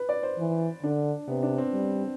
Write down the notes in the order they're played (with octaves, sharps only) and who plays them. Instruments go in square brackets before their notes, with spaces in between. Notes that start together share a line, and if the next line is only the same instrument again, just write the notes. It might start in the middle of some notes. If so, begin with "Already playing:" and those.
Already playing: [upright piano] B4
D5
C5
[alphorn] E3
[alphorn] D3 [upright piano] D4
[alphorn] C3 [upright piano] B3
[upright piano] D4
C4
[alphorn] G3